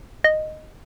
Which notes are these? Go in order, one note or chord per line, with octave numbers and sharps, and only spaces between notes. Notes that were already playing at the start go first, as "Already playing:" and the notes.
D#5